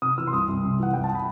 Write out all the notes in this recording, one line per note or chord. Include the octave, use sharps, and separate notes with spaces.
C3 D#6
E3 E6
C6
C2 D#6
C2
C3
E3 F#5
C2 G5
A5
B5